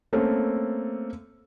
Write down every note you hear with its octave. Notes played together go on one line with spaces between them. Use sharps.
A3 A#3 C4 C#4 A4